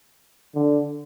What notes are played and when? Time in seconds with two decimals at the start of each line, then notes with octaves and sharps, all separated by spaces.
0.55 D3